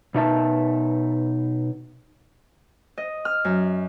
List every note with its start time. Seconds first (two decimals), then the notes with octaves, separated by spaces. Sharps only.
0.15 B2 D#4 E5 A5
2.98 D#5
3.25 F6
3.45 F#2